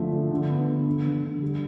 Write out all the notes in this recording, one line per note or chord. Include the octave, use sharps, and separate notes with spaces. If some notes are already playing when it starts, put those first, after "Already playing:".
Already playing: D3 F3 A3
A3
D3
B3
D3
D3
D3
D3
G3